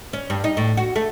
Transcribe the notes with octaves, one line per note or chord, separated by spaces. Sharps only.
C#4
G2
D#4
A2
F#4
A3